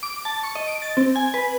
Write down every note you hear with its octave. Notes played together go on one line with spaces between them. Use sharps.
D6
A5
C#6
D#5
D7
A6
C4
G#5
B4